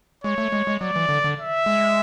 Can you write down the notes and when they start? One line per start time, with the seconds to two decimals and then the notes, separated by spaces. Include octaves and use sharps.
0.24 G#3 C#5
0.38 A3
0.52 G#3
0.67 G#3
0.81 F#3 D5
0.96 E3
1.09 D3
1.24 D3
1.38 E5
1.66 G#3